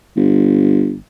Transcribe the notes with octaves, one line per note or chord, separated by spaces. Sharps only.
G1